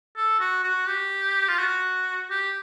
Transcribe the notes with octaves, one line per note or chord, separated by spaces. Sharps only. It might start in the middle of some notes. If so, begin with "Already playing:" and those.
A4
F#4
F#4
G4
F4
F#4
G4